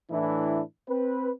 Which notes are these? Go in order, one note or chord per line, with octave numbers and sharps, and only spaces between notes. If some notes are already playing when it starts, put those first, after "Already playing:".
A2 E3 D4 E4
C4 B4